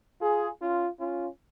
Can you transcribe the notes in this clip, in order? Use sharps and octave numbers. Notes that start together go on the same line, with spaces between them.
F4 G#4
C#4 F4
C#4 F4